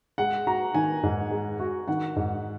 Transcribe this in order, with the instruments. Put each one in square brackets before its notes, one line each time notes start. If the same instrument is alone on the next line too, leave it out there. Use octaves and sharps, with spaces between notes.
[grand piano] G#3 [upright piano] F#5
[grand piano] F#4 [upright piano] A#5
[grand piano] D#3 [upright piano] G#5
[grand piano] G#2
G#3
F#4
[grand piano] D#3 [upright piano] F#5
[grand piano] G#2